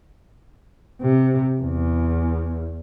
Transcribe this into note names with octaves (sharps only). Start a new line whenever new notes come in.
C3
E2